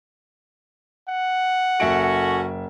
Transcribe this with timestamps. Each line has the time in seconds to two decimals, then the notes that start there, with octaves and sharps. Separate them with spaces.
1.08 F#5
1.80 F#1 C#4 F#4 A4 E5 D7